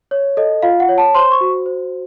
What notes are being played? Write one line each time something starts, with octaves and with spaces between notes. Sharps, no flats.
C#5
A4 D#5
F4 F5
F#5
C#5
A5
C5 C6
C#6
F#4
C5